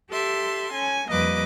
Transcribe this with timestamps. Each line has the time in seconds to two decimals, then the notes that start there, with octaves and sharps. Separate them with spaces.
0.10 G4 A4 E5 C6
0.73 C#4 G#5
1.09 F2 G3 A#3 B4 D#5 D6